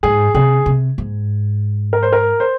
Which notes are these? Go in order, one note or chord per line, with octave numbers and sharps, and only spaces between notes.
G#2 G#4
C3 G#4
C3
G#2
A#4
C5
A#4
C5